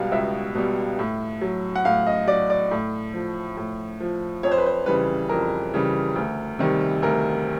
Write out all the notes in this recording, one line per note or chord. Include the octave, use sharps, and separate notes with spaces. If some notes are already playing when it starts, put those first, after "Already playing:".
Already playing: C#2 B2 G3 F5
C#2 E5
B2 G3
A2
F#3
F#5
A2 F5
D#5
F#3 D5
D5
A2
F3
A2
F3
F2 C#5
C5
B4
C5
C#3 E3 G3 B4
F2 A#4
C#3 E3 G3
D2
C3 D#3 G3
D2 A#4